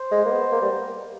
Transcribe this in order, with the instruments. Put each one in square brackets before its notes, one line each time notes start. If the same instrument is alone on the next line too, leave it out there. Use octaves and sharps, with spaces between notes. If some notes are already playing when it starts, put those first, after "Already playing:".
Already playing: [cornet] C5
[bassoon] G#3
A#3
B3
A#3
G3